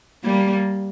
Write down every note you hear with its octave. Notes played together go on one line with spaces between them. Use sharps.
G3 A#3